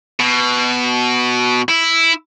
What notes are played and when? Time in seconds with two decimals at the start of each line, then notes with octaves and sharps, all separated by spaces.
0.20 B2
1.68 E4